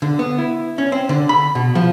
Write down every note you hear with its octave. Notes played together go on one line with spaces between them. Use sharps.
D3
B3
E4
C#4
C4
D3
B5
B2
F3